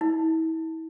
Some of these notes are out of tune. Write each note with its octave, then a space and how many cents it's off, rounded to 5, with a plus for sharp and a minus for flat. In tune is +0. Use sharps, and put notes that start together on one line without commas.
E4 -35